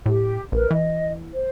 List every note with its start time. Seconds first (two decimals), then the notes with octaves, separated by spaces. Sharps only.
0.06 A2 G4
0.52 A#1 A#4 B4
0.71 E3 D#5
1.34 C5